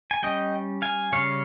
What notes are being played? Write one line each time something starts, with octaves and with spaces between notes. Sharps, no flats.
G#5
G3 C#4 D#5 G5
F5 G#5
C#3 G3 C#4 C#5 F5